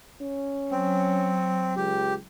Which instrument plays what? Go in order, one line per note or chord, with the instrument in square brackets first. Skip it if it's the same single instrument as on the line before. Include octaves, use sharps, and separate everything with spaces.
[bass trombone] C#4
[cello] F#3 [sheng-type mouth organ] C4
[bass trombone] C#2 [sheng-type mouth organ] G4